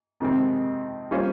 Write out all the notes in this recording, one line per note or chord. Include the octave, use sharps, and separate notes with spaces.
F2 C3 D#3 G#3 C4
G3 A#3 C#4 F4 C5